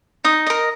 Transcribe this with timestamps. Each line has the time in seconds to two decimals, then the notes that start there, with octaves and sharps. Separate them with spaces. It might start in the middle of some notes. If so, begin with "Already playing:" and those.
0.24 D#4 D#6
0.46 A#4 D#5